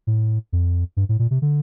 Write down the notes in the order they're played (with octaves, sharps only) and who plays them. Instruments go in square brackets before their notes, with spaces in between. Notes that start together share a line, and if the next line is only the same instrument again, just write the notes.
[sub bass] A2
F2
G2
A2
A#2
C3
D3